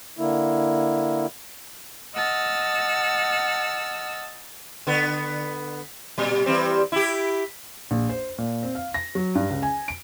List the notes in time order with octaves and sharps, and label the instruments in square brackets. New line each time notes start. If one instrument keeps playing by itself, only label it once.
[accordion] D3 A#3 E4
[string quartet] D#5 F#5 A5 E6 F6
[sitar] D3 B3
A#2 G3
E3 G3 C4
E4 G4
[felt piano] A#1
C5
A#2
C4
F5
A#6
F#3
G2
C#2
G#5
D7